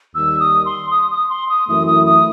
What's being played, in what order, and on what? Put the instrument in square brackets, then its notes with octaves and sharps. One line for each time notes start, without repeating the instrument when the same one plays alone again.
[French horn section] D#2 D#3 G3 [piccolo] E6
[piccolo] D#6
C6
D#6
D#6
C6
D#6
[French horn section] F#2 E3 A3 E4 [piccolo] D#6
[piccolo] D#6
D#6